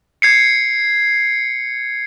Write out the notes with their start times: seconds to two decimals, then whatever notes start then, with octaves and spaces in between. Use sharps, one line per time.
0.22 G#6 C7 C#7